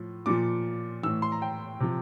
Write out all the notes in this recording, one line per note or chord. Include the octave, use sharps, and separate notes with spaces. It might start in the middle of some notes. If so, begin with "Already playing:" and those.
Already playing: A2 F3
A#2 F3 D6
A2 E3 E6
C6
A#5
G5
C3 F3